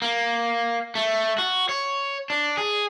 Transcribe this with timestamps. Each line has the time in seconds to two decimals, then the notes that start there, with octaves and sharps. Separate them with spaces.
0.02 A#3
0.95 A3
1.38 F#4
1.69 C#5
2.30 D4
2.57 G#4